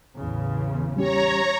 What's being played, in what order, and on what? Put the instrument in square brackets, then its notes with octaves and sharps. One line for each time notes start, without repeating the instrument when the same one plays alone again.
[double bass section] A1 E2 C#3
[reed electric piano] G3 C#4 G4 [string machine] C#5 A#5